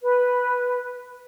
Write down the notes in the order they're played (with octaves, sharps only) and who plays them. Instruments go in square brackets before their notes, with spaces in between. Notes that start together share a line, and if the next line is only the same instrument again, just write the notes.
[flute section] B4